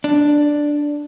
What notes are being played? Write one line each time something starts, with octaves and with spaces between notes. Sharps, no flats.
D4